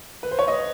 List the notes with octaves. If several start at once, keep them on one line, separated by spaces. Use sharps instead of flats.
B4
C5
C#5
D#5